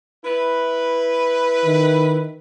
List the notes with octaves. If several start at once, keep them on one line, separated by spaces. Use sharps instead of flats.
E4 B4
D#3